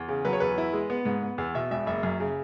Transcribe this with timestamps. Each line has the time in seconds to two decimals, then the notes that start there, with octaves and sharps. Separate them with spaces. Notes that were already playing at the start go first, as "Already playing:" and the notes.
Already playing: E2
0.08 C#3
0.25 F#3 B4
0.33 C#5
0.40 E2 B4
0.58 E4
0.73 G#3
0.90 B3
1.05 G#2
1.23 B3
1.38 E2
1.54 B2 E5
1.71 E1 E5
1.87 F#1 E5
2.03 F#2
2.20 C#3